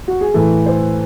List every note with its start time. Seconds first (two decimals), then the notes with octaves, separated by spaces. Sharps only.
0.08 F#4
0.21 G#4
0.34 A2 E3 A4
0.66 C5